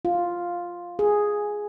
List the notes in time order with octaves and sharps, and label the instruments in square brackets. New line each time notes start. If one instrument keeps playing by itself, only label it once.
[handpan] F4
G#4